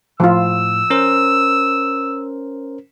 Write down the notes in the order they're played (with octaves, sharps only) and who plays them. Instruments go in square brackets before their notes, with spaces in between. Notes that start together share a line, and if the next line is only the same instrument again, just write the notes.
[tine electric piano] A2 [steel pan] F3 F4 [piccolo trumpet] E6
[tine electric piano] C#4 A#4 C5